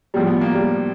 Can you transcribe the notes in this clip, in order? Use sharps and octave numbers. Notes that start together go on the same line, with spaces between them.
A2 F3 G3
B3
A#3
G3